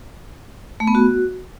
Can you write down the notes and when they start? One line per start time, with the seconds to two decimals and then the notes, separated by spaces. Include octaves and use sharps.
0.80 A3
0.87 B3
0.95 F#4